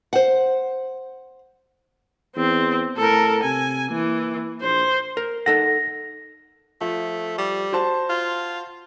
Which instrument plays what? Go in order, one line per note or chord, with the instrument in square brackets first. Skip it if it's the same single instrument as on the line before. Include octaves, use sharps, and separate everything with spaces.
[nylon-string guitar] C5 F#5
[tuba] E2 [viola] C4
[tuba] A2 [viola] A4 A#4
[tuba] C3 [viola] G#5
[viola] E3 [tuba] A#3
[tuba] A#1 [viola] C5
[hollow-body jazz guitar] A#4
[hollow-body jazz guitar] D#4 A4 F#5 [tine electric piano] A#6
[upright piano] F3 [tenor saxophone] A3
[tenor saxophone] G3
[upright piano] F#4 C5 A5
[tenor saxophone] F4